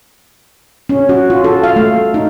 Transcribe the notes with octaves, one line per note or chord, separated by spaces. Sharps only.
C#4
F#4
F4
A4
F5
A3
D#4